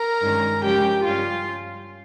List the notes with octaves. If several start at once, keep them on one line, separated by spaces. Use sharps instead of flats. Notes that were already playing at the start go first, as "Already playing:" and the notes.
Already playing: A#4 A#5
G2 D#3 G#3 C#4
C#3 F3 G#3 C#4 G4 G5
G2 G3 C#4 F4 F5